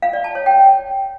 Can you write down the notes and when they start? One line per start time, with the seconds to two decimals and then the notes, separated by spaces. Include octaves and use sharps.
0.02 F5
0.13 D5
0.24 A5
0.35 C#5
0.46 G5